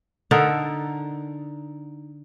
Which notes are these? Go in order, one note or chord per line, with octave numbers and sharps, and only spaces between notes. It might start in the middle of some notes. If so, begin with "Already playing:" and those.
D3 D#4 A4 A#4